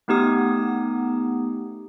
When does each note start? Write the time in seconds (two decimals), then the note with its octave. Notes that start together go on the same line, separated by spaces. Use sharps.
0.08 A3 B3 D#4 G4 D#6